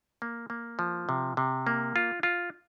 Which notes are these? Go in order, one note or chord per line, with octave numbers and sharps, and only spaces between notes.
A#3
A#3
F3
C3
C3
A#3
F4
F4